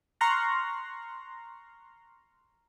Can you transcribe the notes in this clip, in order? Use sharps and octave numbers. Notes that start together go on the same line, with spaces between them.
A#5 C6 C#6 F6 F#6 A#6